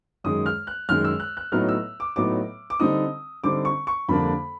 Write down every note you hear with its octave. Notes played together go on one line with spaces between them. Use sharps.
F#2 D#3 G#3 D#6
F6
F#6
F#2 D#3 G#3 F6
E6
F#6
F#6
A2 F#3 B3 D#4 F6
E6
D6
A2 F#3 B3 D#4 D6
D6
D3 G3 C4 D#4 D#6
D3 G3 C4 D#4 D6
C#6
C#6
F2 D3 G3 A#3 D4 B5